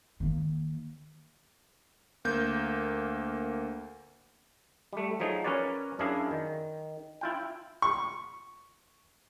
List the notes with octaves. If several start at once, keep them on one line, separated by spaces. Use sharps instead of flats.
D#3 A#3
D2 A#3 G6
G3 A3
F3 F#3 D#4 G#4
C#4 A#4 B4 C#5 D5
F#2 D4 E4 G#4 F5
D#3
E4 F4 G5
C#6